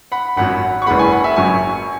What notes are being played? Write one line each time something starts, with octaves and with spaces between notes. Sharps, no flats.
F#5 B5
G#1 F#2 F#3 F#5 B5
C#6
F#1 E2 E3 G#3 F#5 B5
G#5 C#6
F#5 B5
E5 G#5
F#1 F#2 F#3 G#5 C#6